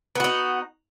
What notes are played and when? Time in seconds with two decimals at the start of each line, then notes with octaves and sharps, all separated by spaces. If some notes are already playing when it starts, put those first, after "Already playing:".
0.15 B3
0.20 F#4
0.24 D#4